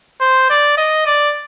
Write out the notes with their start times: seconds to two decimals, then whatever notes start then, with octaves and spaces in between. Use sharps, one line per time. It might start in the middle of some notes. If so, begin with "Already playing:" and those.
0.21 C5
0.50 D5
0.78 D#5
1.06 D5